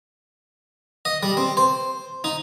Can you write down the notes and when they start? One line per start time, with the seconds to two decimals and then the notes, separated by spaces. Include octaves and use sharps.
1.05 D#5
1.23 G3
1.37 C4
1.57 C5
2.24 D#4